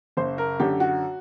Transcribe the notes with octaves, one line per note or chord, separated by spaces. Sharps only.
F#1 C5
A#4
F#2 D3 G4
F#4